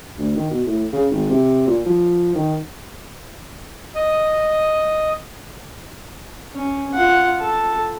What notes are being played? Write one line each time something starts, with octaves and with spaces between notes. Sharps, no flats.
D2
D#3
B2
A2
C#3
G#1
C3
A#2
F3
D#3
D#5
C#4
F4 F#5
A4 A5